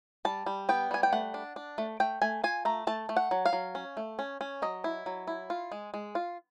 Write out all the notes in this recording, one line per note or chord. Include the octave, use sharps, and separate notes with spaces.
G3 A5
G3
B3 G5
G3 G#5
G5
A3 F#5
D4
D4
A3
A3 G5
A3 G#5
F4 G#5
A3 A#5
A3 A5
A3
F#5
F#3
F5
F#3
C#4
A3
C#4
C#4
F#3 D#5
E4
F#3
E4
F4
G#3
G#3
F4